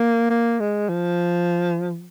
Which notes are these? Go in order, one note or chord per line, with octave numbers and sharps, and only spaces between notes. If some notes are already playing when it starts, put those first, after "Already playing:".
Already playing: A#3
A#3
G#3
F3